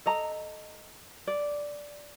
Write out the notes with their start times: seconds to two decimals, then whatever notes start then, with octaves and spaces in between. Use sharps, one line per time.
0.06 A4 D#5 A#5
1.27 D5